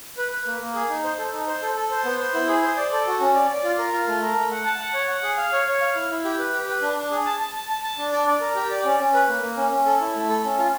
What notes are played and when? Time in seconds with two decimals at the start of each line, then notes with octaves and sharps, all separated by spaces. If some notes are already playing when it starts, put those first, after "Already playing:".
0.17 B4
0.32 B4
0.46 A#3
0.61 A#3
0.75 G#4
0.89 D#4
1.04 C5
1.18 A4
1.32 D#4
1.47 C5
1.62 A4
1.76 A4
1.91 C5
2.05 B3
2.20 C5
2.34 E4
2.48 G#4
2.63 C5
2.77 D5
2.92 A4
3.07 F#4
3.20 C#4
3.35 D5
3.49 D5
3.64 F4
3.78 A#4
3.93 F4
4.07 A3
4.22 A#4
4.36 A3
4.51 F#5
4.65 A5
4.80 F#5
4.94 C#5
5.09 F#5
5.23 G#4
5.37 F5
5.53 C#5
5.66 C#5
5.81 F5
5.95 E4
6.10 E4
6.25 G4
6.39 B4
6.53 G4
6.68 B4
6.82 D4
6.97 D4
7.11 G#4
7.26 A5
7.40 A5
7.55 A5
7.69 A5
7.84 A5
7.98 D4
8.12 D5
8.27 D5
8.41 A#4
8.55 G4
8.71 D5
8.85 C#4
8.99 C#4
9.14 B4
9.28 A#3
9.43 A#3
9.57 C#4
9.71 C#4
9.86 A4
10.00 E4
10.15 A3
10.29 A4
10.44 C#4
10.58 F4